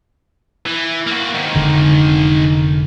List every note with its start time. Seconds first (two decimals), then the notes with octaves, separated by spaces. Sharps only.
0.66 E3
1.07 A#3 F#4
1.34 G#2 D#3
1.55 F1 D3